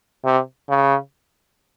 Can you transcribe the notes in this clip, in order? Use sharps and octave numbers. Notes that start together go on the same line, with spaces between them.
C3
C#3